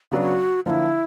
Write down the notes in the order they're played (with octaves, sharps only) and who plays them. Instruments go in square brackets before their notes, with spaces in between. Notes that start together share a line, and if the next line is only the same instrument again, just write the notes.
[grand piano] C#3 F#3 B3 D4 [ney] F#4 G4
[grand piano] D3 F3 A#3 [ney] E4 F4